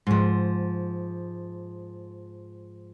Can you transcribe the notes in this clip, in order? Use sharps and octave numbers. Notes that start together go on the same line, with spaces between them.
G#2 F3